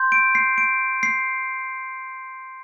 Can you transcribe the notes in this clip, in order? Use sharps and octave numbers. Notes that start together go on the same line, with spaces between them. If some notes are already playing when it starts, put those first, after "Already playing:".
Already playing: C6 G6
D7
C7
D7
C7